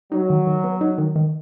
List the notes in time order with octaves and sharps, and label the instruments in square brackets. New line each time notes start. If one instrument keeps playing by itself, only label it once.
[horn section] F#3 [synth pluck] D#4
[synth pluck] D#3
D#3
B3
D#4
D#3
D#3